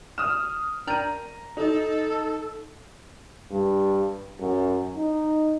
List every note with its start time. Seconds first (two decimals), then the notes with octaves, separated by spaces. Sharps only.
0.18 D#6 F6 E7
0.87 D4 A#4 G5 A#5 D#7
1.57 D#4 A4
3.51 G2
4.40 F#2
4.96 D#4